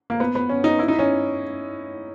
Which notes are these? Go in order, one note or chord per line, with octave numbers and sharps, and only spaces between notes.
A#3
B3
B3
C#4
D#4
E4
D#4
C#4